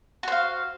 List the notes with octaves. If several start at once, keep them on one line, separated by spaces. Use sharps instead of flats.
F#4 C5 F5